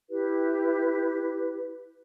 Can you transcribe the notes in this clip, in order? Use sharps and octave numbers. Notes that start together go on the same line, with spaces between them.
E4 G4 B4